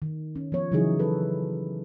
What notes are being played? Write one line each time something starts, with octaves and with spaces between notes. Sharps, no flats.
D#3
C#4
F3 B3 C#5
C#3 E3 F#3 D#4 E4 G#4
A4 B4